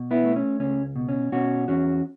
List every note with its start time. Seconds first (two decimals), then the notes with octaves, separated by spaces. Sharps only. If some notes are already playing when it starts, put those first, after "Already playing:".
Already playing: B2
0.11 B3 E4
0.24 A3
0.36 C#4
0.60 C#2 C#4
0.96 B2
1.08 C#4
1.32 B2 C#4 F#4
1.68 E2 C#4 F#4